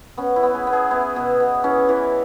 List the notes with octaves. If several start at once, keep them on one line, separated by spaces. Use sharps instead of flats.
B3 C#4
E4
B3
G#4
B3
G#4
B3 E4
B2
B2
E3 C#4
E3